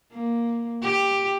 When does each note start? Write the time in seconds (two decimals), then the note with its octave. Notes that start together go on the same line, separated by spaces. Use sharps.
0.12 A#3
0.82 G4